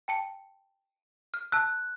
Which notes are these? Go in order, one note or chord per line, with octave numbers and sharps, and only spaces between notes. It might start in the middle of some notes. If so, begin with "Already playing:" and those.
G5 A5 C#7
F6
A5 E6 F#6